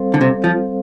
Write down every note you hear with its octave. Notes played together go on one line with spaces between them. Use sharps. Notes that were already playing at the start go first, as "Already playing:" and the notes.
Already playing: G3 C4 A4 C5 F5
D3
C3
F3